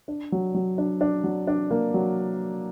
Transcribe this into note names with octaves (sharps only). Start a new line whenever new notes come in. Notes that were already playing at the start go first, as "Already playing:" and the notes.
D4
F#3
F#3
D4
D4
F#3
D4
A#3
F#3